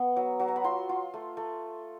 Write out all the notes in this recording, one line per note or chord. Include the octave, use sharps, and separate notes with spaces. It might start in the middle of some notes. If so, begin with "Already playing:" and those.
Already playing: B3
F#3
F#3
A#5
B5
F4 C6
F4
A3
A3